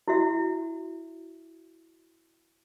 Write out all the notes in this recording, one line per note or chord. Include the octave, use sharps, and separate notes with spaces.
E4 F#4 E5